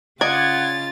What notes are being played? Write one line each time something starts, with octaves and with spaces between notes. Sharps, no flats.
C#3 F4 D5 D#5 F#5 G#6 A6